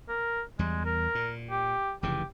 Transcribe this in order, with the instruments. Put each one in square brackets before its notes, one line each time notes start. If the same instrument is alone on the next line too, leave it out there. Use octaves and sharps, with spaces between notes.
[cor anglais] A#4
[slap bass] E2 G3 [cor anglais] G#3
[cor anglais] A#4
[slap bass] A#2
[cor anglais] G4
[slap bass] F1 C#3 E3 [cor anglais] G4